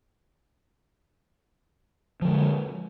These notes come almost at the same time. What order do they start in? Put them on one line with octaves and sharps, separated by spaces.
F3 D3 G#3